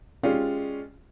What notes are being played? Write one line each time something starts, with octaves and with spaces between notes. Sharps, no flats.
G#3 C#4 F4 G4 G#4 D5